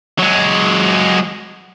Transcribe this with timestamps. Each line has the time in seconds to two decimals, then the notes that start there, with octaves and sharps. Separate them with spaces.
0.19 F#3 G#3